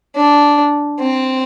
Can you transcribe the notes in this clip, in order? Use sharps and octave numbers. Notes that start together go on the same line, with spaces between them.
D4
C4